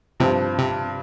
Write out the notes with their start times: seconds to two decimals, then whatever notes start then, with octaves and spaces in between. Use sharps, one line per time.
0.20 G2 C3 F3 C4
0.59 C3